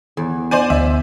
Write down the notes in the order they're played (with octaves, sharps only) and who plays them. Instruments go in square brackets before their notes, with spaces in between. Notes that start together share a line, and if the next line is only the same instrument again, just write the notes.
[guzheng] E2
[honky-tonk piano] C5 D5 G#5
[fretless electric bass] D2 [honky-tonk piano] E5